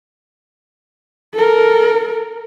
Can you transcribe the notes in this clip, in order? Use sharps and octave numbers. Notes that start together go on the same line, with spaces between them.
A4 A#4